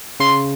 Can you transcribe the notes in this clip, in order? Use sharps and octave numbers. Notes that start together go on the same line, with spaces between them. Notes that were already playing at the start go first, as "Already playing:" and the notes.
C#3 C6